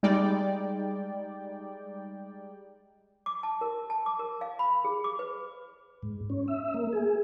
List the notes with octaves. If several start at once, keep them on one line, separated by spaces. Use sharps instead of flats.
G3 G#3 D#4 D5 G5
D6
A5
A#4
A5
D6
A#4
F5
B5
G#4
D6
B4
G#2
C#4
E5
A#3
G#4